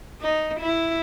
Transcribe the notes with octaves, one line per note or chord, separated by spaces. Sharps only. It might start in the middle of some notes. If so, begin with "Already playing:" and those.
D#4
E4